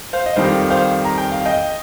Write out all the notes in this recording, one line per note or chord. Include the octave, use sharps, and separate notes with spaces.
C5 F5
D#5
F2 D#3 G3 C5 F5
C5 F5
A#5
G5
F5
D#5 G5